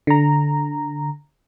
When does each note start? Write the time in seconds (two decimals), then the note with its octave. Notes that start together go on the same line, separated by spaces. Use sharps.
0.07 D3 A#5